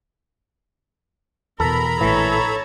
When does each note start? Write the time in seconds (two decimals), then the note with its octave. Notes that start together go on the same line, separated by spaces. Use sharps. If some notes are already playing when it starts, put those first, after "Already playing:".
1.60 E2 B2 A4 A#4 A#5 B5
2.01 A#1 A2 E3 A4 C#5